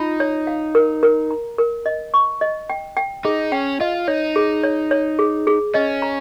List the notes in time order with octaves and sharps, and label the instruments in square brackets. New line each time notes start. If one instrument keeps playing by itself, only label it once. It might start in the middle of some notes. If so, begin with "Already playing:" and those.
Already playing: [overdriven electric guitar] D#4 [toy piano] F4
[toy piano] C#5
F5
A#4
A#4
A#5
A#4
D#5
C#6
D#5
G5
G5
[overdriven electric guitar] D#4 [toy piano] G#4
[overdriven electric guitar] C#4 [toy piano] G5
[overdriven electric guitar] F4 [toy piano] D#5
[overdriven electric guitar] D#4 [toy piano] C#5
[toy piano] G#4
C#5
C#5
G#4
G#4
[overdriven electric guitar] C#4 [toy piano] D#5
[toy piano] A#5